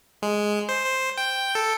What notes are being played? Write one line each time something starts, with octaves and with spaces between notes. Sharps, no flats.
G#3
C5
C5
G5
A4